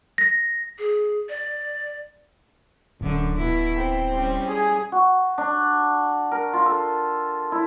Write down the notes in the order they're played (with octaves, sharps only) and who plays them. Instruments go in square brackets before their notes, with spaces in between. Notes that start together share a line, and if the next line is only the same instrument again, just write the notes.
[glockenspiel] A#6
[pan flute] G#4
D5
[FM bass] D1 [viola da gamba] F#2 D3
[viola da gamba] B2 E4
[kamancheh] C4
[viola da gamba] G3 C#4
[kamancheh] G#4 G#5
[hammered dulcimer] F#4
D4
A#4
F4
A4
E4